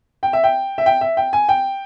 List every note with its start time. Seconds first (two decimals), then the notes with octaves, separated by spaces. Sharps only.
0.23 G5
0.33 E5
0.44 G5
0.78 E5
0.86 G5
1.01 E5
1.17 G5
1.33 G#5
1.49 G5